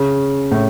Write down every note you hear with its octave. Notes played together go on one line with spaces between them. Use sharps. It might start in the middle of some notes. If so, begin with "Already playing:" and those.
Already playing: C#3
A2